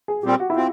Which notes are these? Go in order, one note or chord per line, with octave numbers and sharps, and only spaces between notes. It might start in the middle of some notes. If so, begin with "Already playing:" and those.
G#4
A#2 G3 C4 G4
F#4
E4
C4 F4